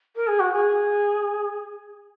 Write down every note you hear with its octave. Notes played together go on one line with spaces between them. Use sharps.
A#4
G#4
F#4
G#4